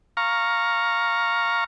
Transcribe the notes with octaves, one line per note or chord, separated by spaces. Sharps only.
F5 A#5 C#6